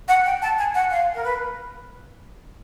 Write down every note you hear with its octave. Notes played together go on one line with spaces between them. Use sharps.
F#5
G5
A5
G#5
F#5
F5
A#4
B4